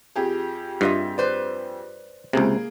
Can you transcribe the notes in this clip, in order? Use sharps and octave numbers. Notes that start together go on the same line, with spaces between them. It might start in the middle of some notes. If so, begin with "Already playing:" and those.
F2 G4 G#4
G2 F4 D#5 E5
B4 C5 D5
C#2 C3 A#3 G#4